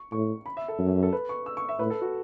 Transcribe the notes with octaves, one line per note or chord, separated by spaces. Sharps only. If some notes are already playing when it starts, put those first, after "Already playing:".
Already playing: C#6
A2 C#6
B5
E5
A4
F#2
A4
B4
C#6
E6
C#6
E5
A2 B4
A4
F#4